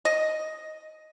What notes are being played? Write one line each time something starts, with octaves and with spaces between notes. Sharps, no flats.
D#5